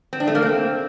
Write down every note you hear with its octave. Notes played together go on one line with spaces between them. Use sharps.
C4
D4
A3
A#3
C4